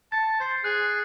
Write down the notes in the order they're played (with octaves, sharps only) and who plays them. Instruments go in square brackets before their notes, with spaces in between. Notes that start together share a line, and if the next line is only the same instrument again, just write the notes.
[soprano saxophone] A5 [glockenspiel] A6 C#7
[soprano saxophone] C5 [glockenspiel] A6 C7
[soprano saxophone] G#4 [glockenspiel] F#6